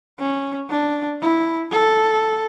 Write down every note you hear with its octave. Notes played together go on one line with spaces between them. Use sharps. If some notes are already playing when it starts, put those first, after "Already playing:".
C#4
D4
E4
A4